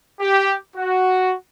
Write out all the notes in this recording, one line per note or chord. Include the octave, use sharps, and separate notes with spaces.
G4
F#4